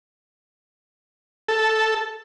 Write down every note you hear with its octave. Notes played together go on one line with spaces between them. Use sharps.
A4